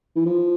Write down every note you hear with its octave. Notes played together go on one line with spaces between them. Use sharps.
E3
F3